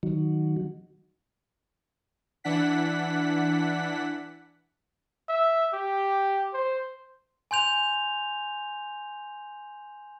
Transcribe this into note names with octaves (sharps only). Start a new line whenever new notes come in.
D#3 F#3
E3 D4 F#5 B6
E5
G4
C5
G#5 C6 G6 F7